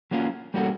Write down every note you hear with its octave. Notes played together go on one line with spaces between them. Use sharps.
F#3 A#3 C#4 F4
G3 A#3 C#4 F#4 A4